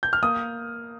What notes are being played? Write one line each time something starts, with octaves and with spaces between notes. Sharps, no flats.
G6
F6
A#3 D#6